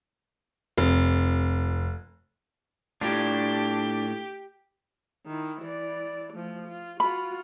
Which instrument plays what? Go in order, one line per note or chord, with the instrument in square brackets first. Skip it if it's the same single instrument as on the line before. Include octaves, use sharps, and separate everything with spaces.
[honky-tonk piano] F1
[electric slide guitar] A2 F4 [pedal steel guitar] D4 [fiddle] G4
[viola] D#3 E4
E3 D5
F3 A3
F4
[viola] F4 F#4 [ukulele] B5